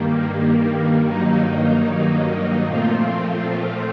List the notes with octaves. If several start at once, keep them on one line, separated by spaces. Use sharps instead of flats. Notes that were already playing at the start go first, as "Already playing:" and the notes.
Already playing: G2 D#3 G3 A#3
G2 D#3 F#3 A#3 D#4
A#2 F3 A3 C4 F4